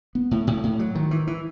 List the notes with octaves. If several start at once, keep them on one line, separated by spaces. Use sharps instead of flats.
B3
A2
A2
A2
F#3
D#3
E3
E3